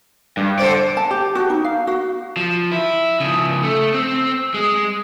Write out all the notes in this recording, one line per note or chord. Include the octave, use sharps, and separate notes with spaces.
G2
A4 C5 D5
A5
G4
F#4
D#4
F5
F#4
F3
E4
C#3 F3
A3
C4
G#3